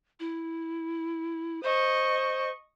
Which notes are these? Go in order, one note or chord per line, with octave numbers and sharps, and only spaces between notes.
E4
C5 D#5 C#6